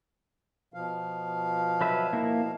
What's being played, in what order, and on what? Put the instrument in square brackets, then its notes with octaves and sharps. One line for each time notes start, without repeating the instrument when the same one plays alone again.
[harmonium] B2 F3 F5
[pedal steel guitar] F#3 B4 E5
A#3 E4